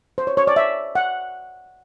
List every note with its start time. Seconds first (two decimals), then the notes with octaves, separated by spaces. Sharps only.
0.18 C5
0.27 C#5
0.37 C#5
0.47 D5
0.56 E5
0.95 F#5